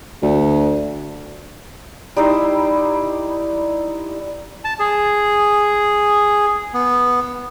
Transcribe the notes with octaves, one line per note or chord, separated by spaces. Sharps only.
D2
G3 D#4 E4 C5
A5
G#4
B3